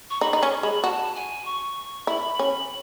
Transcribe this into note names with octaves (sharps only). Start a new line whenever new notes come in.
C#6
D#4 B5
D#4 B5
C#4 C#6
G#3 B5
F#4 A5
G#5
C#6
E4 B5
C#4